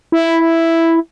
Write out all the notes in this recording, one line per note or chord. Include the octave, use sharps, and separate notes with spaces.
E4